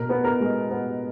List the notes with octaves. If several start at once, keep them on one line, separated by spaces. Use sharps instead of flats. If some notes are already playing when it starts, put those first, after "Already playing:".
Already playing: B2 A#4
B3
A#4
G#3
B3